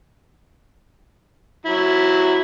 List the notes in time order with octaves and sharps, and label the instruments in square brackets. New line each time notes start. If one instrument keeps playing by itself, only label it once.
[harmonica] F#3 E4